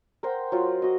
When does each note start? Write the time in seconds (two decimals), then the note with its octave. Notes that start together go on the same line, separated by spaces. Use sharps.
0.23 A#4 C5 F#5 G5
0.52 F#3 F4
0.82 F#4 D#5